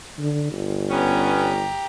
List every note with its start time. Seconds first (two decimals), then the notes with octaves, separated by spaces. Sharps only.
0.19 D3
0.52 G1
0.90 B3 C#4 G4 A#5